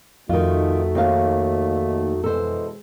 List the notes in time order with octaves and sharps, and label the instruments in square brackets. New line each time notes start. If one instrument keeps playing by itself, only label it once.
[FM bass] F2 [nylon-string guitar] D#3 F4 [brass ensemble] A3 D#4 F#4
[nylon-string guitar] D#2 A#4 F5
[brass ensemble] B2 E3 G#3 [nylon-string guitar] A4 C5